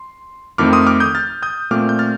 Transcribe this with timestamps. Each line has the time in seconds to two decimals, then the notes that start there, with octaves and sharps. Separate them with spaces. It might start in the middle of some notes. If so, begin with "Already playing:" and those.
Already playing: C6
0.58 F2 D#3 A3 C4 D6 F6
0.73 C6 D#6
0.86 D6 F6
1.00 D#6 G6
1.15 F6 A6
1.42 D#6 G6
1.71 A#2 A3 C4 D6 F6
1.89 G6
1.99 F6 A6